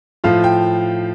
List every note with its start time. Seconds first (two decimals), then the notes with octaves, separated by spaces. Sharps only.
0.24 A2 F3 F4 F5
0.44 G5